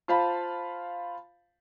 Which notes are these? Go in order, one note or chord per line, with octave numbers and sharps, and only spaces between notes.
F4 C5 F5 A5 B5